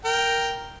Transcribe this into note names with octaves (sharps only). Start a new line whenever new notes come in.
A#4 G5